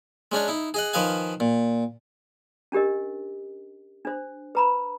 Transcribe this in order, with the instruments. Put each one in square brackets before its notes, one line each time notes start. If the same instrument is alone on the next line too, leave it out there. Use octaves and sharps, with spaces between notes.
[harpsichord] G#3 C#4 D4 C#5
D#4 E4
G#4 D#5 F#5
D#3 F3 B4 D#5 F5 G#5
A#2
[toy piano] C#4 D4 G4 A#4 D#5
D4 C5
B4 A#5 B5